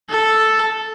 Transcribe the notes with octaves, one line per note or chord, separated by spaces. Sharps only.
A4